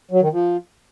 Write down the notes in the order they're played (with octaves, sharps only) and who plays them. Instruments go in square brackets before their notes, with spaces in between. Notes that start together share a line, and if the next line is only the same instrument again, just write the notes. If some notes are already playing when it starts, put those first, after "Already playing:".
[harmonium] F#3
D#3
F3